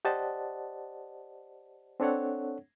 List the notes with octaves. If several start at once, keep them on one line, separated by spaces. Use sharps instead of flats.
G4 C5 D5 D#5 F#5 A5
C4 D4 A4 C#5 F#5